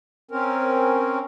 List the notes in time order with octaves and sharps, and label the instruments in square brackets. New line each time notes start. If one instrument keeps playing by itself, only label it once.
[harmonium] C4 C#4 A#4